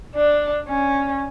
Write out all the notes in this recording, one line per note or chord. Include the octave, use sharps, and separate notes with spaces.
D4
C#4